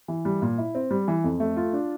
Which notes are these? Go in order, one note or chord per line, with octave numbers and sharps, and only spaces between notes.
E3
G3
A#2
E4
C4
G3
E3
F2
A3
F4
D4